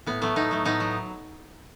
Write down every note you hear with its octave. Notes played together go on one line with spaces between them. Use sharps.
A2 B3
F#3 A3 B3
A2 B3 D#4
F#3 A3
A2 B3 D#4
F#3